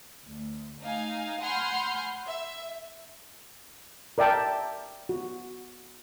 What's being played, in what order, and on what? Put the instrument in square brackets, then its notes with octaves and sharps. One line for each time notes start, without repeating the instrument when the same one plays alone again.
[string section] D2
A3 D#4 F5 G#5
F#5 G#5 B5 C6 F6 G6
E5
[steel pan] A#4 D5 E5 G5 A5
F#4